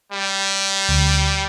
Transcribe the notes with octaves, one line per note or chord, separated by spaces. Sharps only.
G3
D2